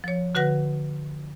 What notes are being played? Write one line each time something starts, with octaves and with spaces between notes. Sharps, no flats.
F3 C#5
D3 F#4 B4 F#5 A#6